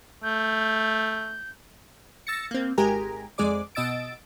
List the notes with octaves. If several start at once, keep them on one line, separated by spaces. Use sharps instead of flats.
A3 G6
E6 A6 A#6 C#7
A#3 C4
G#1 G#3 G4 A#4 G#5 A#5
F2 G#3 G#4 D5 D6
B2 D#5 E6 A6 D7